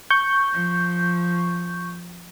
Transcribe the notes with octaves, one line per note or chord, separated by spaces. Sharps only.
C#6 G6
F3